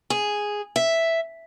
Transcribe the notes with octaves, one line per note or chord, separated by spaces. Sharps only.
G#4
E5